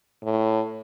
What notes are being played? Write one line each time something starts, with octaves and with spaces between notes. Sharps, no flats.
A2